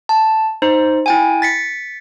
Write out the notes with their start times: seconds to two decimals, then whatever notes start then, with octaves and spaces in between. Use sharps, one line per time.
0.09 A5
0.62 D#4 C5
1.06 E4 G5 G#5
1.42 A6 B6 C#7